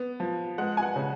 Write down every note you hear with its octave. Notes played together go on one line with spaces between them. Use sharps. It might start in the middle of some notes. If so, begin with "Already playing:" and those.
Already playing: B3
F3
G#3 F#5
G#5
F#5
C#3